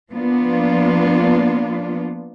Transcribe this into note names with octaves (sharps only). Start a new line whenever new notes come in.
F3 A#3 B3 D4 F4